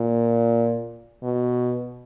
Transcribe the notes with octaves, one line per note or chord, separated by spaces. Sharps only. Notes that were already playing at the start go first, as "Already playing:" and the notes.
Already playing: A#2
B2